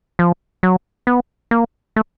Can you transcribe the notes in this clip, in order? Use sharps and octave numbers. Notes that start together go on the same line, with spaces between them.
F3
F#3
B3
A#3
A3